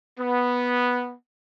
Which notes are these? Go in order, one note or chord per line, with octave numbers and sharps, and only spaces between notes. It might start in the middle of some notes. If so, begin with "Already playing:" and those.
B3